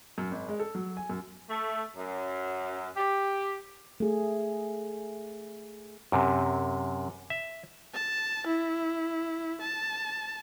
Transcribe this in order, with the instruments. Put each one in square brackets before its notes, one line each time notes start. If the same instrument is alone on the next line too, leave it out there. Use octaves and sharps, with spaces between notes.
[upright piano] F#2
G#1
G#3
A4
F#3
G#5
F#2
[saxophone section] A3
F#2
G4
[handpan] A3 G#4
[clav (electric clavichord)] F#2 C3
E5
[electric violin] A5
E4
A5